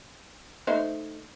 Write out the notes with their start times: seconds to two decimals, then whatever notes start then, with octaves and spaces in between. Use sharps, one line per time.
0.67 A3 D#4 C5